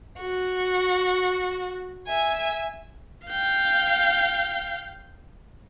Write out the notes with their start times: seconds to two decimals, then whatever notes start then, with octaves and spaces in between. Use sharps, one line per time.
0.19 F#4
2.08 E5 G#5
3.27 F5 G5